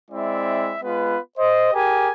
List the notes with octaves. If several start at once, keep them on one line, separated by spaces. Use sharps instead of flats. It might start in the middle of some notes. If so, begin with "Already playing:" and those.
G#3 C4 E4 D5 E5
G#3 B3 F4 B4
C5 D#5
G4 G#4 A#4 G#5